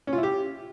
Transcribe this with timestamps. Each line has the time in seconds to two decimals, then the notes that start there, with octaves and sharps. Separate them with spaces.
0.07 C#4
0.13 F4
0.18 E4
0.23 G4